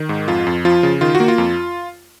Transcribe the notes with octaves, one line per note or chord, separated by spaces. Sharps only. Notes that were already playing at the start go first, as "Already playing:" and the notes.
Already playing: D#3
G#2
F2 F4
F2
F3 F4
C#3
D#3 F4
F#4
A#3
F4
F2